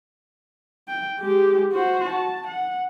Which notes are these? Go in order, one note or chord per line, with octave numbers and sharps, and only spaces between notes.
G5
G#3 G4
F#4 C5
A5
F#5